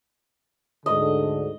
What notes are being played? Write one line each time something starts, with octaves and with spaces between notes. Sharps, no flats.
D2 G#2 D3 D#5